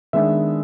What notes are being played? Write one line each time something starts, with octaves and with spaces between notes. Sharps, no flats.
D#3 G#3 B3 D4 E5